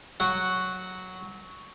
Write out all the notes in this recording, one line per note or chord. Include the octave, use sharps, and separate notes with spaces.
F#3 F#5